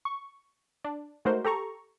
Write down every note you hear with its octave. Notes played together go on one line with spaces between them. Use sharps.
C#6
D4
G#3 A3 D#4 F#4 A#4 C5
G4 A4 A#5 C#6